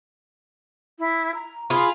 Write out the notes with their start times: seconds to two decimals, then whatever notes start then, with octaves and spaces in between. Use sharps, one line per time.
0.99 E4
1.34 A#5
1.70 F4 G#4 B5